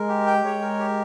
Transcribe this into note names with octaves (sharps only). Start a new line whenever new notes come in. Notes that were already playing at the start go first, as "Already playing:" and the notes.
Already playing: G#3 A#4
G4
G5
G#3 C#5
A#4
G4